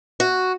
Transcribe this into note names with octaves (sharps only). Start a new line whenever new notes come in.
F#4